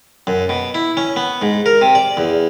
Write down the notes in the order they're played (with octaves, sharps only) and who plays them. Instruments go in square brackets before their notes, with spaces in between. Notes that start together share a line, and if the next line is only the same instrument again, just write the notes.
[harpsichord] F#2
B2
E4
C#4
B3
G#2
A#4
C3
D5
E2